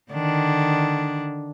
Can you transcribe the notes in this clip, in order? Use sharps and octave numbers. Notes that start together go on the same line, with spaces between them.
D3 D#3 D4